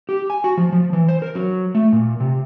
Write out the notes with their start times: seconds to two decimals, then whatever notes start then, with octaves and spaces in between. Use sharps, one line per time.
0.09 G4
0.30 G#5
0.44 F#4
0.57 F3
0.72 F3
0.93 E3
1.09 C5
1.22 A#4
1.35 F#3
1.75 A3
1.93 A#2
2.20 C3